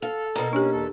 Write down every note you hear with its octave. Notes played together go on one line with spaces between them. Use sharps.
A4 F5
B2 A#3
C#4 D4 G4
E2 A4